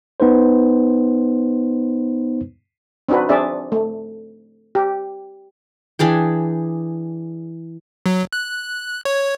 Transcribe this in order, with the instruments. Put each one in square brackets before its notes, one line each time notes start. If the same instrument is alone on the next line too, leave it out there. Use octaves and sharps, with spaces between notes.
[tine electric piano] B3 D#4 B4 C5
[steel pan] C4 D4 D#4 F#4 B4
C4 D4 G#4 D5 E5
A3
G4
[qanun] E3 D4 G#4 G5
[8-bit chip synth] F#3
F#6
C#5